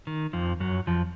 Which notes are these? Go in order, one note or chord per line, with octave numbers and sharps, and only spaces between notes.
D#3
F2 F3
F#2 F#3
F2 F3